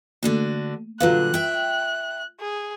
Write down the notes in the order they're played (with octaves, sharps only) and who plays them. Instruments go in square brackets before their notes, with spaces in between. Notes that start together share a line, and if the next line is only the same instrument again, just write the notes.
[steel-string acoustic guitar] D3 D4 F#4 [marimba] A3 A#3
[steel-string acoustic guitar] A#2 D3 F#3 [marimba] F4 B4 F5 [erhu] F#6
[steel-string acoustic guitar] E5 G5
[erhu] G#4